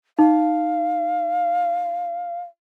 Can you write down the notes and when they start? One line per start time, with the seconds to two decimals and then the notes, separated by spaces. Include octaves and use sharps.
0.19 D#4 F5